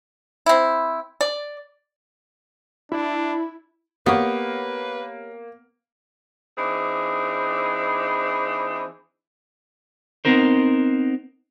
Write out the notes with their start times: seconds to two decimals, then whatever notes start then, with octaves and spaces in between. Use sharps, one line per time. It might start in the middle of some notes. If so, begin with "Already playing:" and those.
0.46 C4 E4
1.21 D5
2.92 D4 E4
4.06 A#3 B3 G4 B4 C#5
6.58 E3 C4 D4 D#4 G#4
10.25 B3 C4 D#4 A#4 C5